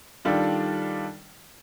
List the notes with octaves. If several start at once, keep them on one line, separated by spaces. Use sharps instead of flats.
D#3 G3 D4 F4 A4